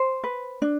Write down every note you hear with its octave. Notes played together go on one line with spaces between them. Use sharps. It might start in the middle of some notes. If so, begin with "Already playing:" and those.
Already playing: C5
B4
D4